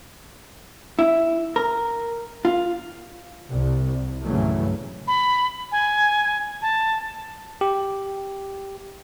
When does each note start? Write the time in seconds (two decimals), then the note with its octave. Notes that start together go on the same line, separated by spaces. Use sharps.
0.99 E4
1.56 A#4
2.45 F4
3.50 C2
4.24 G2 A#2 C#3 E3 F#3 A3
5.08 B5
5.72 G#5
6.62 A5
7.61 G4